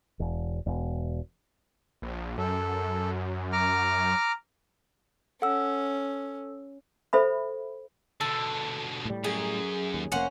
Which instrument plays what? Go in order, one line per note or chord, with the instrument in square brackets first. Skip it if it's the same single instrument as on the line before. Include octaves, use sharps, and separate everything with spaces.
[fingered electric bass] E1
E1
[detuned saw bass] A#1
[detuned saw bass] F#2 [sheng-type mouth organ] A4
[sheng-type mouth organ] A#5 D6 F6
[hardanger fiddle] C#4 [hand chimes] A4 E6 [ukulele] F#5
[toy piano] A4 C5 E5 B5
[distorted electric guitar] B2 D3 [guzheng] A4
[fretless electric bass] A2 G3
[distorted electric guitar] F#2 [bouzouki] G#4
[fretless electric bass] D#2
[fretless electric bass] F1 A#3 [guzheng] C#4 [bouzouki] C5 F#5